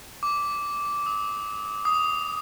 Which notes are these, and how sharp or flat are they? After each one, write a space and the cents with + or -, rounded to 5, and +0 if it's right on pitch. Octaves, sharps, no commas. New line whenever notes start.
D6 -10
D#6 +35
D#6 +5